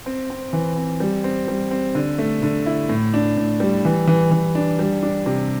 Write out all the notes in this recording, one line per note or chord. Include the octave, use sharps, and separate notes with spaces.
C4
C4
E3
C4
G3
C4
G3
C4
D3
A3
D3
E4
A2
D4
A2
G3
E3
E3
E3
D4
G3
D4
C3